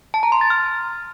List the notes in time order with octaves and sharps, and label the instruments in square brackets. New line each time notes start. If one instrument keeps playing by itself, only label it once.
[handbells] A5
A#5
C6
A6
F6